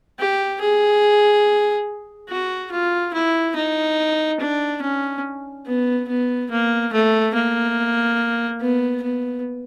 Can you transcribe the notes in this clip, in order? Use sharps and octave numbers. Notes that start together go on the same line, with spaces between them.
G4
G#4
F#4
F4
E4
D#4
D4
C#4
B3
B3
A#3
A3
A#3
B3
B3